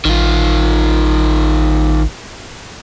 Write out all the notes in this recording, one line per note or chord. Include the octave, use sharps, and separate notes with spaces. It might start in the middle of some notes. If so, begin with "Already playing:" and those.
A1 D#3 F4